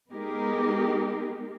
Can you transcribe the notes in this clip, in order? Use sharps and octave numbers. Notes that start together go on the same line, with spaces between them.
G#3 B3 D#4 G4 G#4 A#4